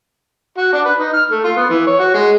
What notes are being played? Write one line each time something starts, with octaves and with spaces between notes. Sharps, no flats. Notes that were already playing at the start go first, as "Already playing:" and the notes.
F#4
D4
B4
D#4
F6
A3
F4
B3
E3
C#5
F#4
G#3